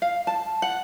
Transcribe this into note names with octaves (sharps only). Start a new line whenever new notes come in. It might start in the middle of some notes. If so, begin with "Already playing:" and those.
F5
A5
F#5